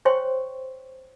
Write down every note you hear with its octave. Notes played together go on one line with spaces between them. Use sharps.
C5 C#5 G5 C6 C#6